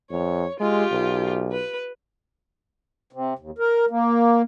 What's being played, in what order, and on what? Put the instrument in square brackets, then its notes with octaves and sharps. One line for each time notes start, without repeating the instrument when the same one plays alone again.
[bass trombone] F2 [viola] C#5
[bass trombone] G#3 [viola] F4 G4
[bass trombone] B1
[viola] B4
[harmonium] C3
D#2
A#4
A#3